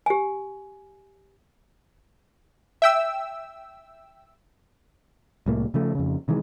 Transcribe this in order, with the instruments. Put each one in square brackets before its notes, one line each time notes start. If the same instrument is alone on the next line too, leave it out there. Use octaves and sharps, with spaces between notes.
[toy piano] G4 G#5
[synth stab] E5 G5 E6
[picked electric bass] C2 A2 A#3
C#3 F3 A3
F2 C#3
C3 D#3 E3 G#3